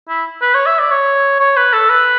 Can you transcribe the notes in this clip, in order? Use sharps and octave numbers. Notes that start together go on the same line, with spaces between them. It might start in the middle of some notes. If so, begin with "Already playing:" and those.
E4
B4
C#5
E5
D5
C#5
C#5
B4
A4
B4